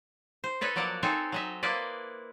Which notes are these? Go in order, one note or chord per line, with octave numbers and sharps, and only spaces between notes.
C5
A4 B4 C#5 D#5
F3 F#3 A#3 D5 F#5
C4 D#4 A4 C5 C#5 G#5
F#3 D#5 E5
A#3 E4 B4 C5 D5 D#5